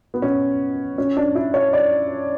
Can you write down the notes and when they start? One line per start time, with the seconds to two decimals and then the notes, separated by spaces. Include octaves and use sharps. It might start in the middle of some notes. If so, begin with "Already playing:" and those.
0.14 B3
0.22 C#4
0.98 C#4
1.17 D4
1.35 E4
1.54 C#5
1.73 D5